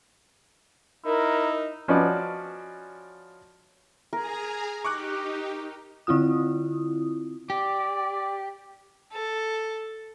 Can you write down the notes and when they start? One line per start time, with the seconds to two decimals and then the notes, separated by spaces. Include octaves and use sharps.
1.05 D#4 E4 A#4
1.88 F3 C#4 D#4 F#4 B4 D5
4.13 G#4 A#4 G#5 A#5
4.85 D#4 G4 C#6 D6 F#6
6.07 D3 C4 E4 F4 D#6
7.50 G4 D5
9.13 A4